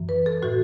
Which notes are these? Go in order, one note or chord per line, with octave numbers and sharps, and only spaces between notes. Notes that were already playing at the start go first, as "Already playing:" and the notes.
Already playing: F#2 E3
B4
A4
A2 E3 F#4